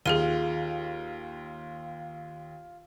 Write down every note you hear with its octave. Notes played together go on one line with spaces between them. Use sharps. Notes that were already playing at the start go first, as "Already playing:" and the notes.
D#2 F4 G#4 F6 D#7 G7